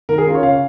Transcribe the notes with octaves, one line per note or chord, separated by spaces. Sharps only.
D#3 A#4
G#4
C#4 F4 A#4
C#5
C#3 F5